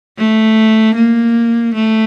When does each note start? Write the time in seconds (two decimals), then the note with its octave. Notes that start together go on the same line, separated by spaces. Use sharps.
0.18 A3
0.95 A#3
1.75 A3